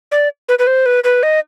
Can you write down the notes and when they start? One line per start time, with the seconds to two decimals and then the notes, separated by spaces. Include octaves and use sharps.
0.12 D5
0.49 B4
0.59 B4
0.67 C5
0.86 B4
1.04 B4
1.23 D#5